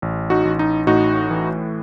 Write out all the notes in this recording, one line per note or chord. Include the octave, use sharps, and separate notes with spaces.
A1
D#4 F#4
A1
D#4
A2 D#4 F#4
E3